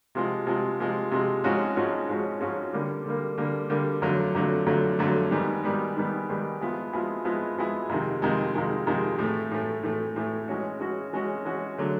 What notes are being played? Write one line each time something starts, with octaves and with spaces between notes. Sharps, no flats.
C3 F3 G#3
C3 F3 G#3
C3 F3 G#3
C3 F3 G#3
G#2 F3 G#3 C#4 F#4
G#2 F3 G#3 C#4 F#4
G#2 F3 G#3 C#4 F#4
G#2 F3 G#3 C#4 F#4
D3 G3 A#3
D3 G3 A#3
D3 G3 A#3
D3 G3 A#3
F2 D3 F#3 A3
F2 D3 F#3 A3
F2 D3 F#3 A3
F2 D3 F#3 A3
G#2 D#3 G3 B3
G#2 D#3 G3 B3
G#2 D#3 G3 B3
G#2 D#3 G3 B3
F3 G#3 B3 E4 G#4
F3 G#3 B3 E4 G#4
F3 G#3 B3 E4 G#4
F3 G#3 B3 E4 G#4
F2 C3 D#3 G#3
F2 C3 D#3 G#3
F2 C3 D#3 G#3
F2 C3 D#3 G#3
A2 E3 A3
A2 E3 A3
A2 E3 A3
A2 E3 A3
E3 G#3 C#4 F#4
E3 G#3 C#4 F#4
E3 G#3 C#4 F#4
E3 G#3 C#4 F#4
D3 F#3 A3